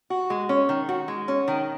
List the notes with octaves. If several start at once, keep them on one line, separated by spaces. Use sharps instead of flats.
F#4
G#3
C#4
D#3
F#4
G#3
C#4
D#3